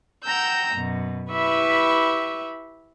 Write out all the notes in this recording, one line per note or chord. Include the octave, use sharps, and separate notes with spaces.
F#5 G5 A#5 E6 G6
F#2 B2
E4 G4 B4 E5 B5 C#6